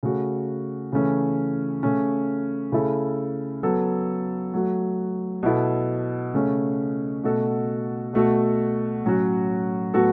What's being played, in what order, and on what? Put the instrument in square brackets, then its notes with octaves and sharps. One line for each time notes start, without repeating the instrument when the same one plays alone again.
[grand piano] C#3 A3 F#4
C#3 E3 A3 C#4
C#3 A3 C#4
C#3 A3 E4 A4
F#3 B3 A4
F#3 A3 F#4
B2 B3 E4 A4
C#3 A3 C#4
B2 A3 F#4 A4
B2 A3 F#4 A4
A2 F#3 C#4 F#4
A2 F#3 B3 F#4 A4